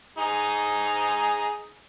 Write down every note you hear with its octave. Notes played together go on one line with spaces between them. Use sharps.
D#4 G#4